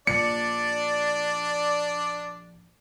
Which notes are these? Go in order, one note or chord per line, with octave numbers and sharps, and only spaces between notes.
A#1 D4 D5 C#7